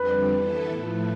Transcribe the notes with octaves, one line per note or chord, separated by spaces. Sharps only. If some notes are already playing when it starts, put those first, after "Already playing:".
Already playing: F2 D3 G3 C4 B4
E3 B3 E4 A4
A2 F3 A3